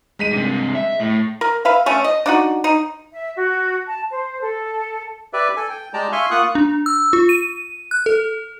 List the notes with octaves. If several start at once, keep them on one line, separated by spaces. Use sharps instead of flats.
G#3 B6 D#7
G2 C3
E5
A2
A#4
B4 E5 F5
A3 C#4 D4
D#5
D4 D#4 F#4
D#4
E5
F#4
A5
C5
A4
G4 B4 D5 E5
A4 G#5
G5
G#3 G4 D5 G5 A5 A#5
E5 F5 G#5 C6 C#6
A#3 F4 F#5 C#6 D#6 F#6
D4
E6
F4
D#7
F#6
A4